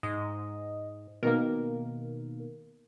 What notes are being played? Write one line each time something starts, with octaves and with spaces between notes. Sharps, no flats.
G#2 D#5
B2 D#3 A#3 A#4